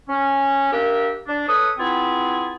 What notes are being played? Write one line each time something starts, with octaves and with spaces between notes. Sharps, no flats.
C#4
A#3 D4 G4 A#4 E5
D4
A4 B4 C#5 D#6
B3 C4 E4 F4 G#4